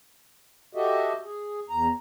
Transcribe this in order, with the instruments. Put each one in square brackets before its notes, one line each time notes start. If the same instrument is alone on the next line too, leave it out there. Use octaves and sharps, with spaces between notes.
[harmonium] F#4 G4 A4 D#5 E5
G#4
E2 A#5